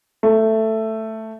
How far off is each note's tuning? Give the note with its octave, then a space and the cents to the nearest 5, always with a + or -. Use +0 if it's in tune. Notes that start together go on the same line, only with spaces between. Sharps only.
A3 +5